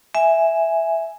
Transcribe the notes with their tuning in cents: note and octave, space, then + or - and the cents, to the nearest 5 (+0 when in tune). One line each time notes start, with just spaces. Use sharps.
E5 +0 G#5 +0